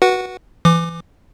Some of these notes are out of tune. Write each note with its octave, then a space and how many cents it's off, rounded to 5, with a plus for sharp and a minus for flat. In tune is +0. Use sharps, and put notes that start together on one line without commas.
F#4 +0 B4 -25 F#5 +0
E3 +25 D6 +20